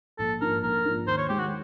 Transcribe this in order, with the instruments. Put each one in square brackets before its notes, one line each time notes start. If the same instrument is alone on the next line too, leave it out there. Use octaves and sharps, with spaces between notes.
[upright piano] A#1 [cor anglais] A4
[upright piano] G#2 F3 A#3 D4 [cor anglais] A#4
[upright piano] A#1 [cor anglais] A#4
[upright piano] G#2 F3 A#3 D4
[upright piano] D#2 [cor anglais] C5
[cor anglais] C#5
[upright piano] D#3 G#3 [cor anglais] G4
[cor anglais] F#4